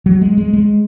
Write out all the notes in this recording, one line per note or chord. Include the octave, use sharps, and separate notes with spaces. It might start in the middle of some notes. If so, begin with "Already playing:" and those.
F#3
G#3
G#3
G#3